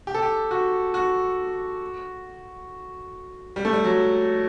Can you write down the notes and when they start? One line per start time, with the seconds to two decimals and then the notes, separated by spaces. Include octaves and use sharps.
0.07 G4
0.15 A4
0.22 G4
0.51 F#4
0.94 F#4
3.56 G3
3.65 A3
3.73 G3
3.84 F#3